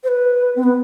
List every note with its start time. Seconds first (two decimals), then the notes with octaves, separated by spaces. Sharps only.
0.04 C5
0.08 B4
0.56 C4
0.63 B3